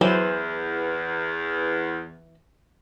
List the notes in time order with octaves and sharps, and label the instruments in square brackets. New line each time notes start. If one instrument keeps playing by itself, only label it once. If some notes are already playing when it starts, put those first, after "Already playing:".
[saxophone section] E2 [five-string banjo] E3 C5 [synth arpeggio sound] F#3